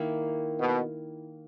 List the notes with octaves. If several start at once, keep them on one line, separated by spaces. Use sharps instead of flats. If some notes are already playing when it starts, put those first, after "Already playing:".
Already playing: D#3 A#3 E4
B2